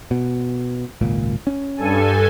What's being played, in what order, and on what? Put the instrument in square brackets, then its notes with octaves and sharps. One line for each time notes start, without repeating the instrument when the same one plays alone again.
[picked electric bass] B2
G#1 C#2 A#2
C#4
[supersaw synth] G2 A4 G#5